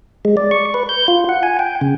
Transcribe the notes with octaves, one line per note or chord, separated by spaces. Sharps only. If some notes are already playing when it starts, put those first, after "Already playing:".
G#3
D5
C#6
B4
G6
F4
F#5
G#5
G5
C#3